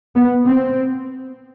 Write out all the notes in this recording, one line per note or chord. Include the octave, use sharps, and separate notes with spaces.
B3
C4